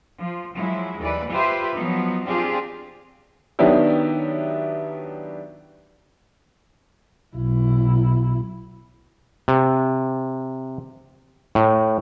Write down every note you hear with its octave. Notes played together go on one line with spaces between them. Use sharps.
F3
F3 F#3 G#3 E4
D#2 E3 B4 D5
F4 G4 B4 C5 E5
F3 F#3 B3 D#4
C4 D4 F4 G4 G#4
D#3 F#3 B3 D4 E4 G4
B1 E4
C3
A2